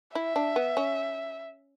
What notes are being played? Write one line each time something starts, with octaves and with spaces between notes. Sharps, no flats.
E4 E5
D4
B3
C#4